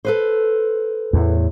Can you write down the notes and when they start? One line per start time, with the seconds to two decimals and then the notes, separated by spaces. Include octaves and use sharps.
0.05 A4 B4 C5
1.13 E2 A2